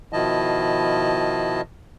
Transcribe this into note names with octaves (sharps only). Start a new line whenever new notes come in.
B2 D#3 F3 E4 D#5 A5